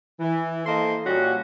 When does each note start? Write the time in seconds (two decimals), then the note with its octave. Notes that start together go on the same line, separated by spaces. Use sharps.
0.20 E3
0.66 A#3 A4 C5 D#5 C6
1.06 A#2 G3 C#4 F#4